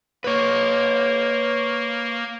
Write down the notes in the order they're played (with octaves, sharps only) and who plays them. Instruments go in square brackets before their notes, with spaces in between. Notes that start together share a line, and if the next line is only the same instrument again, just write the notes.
[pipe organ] A#3 [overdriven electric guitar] B4 C#5